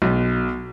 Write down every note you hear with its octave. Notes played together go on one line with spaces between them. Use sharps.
B1